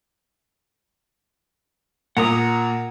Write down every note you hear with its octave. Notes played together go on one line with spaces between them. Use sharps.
A#2 A#3 F#5 A#5 D#6